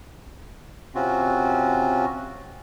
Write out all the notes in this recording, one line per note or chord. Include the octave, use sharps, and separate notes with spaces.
C3 C4 C#4 F4 F#4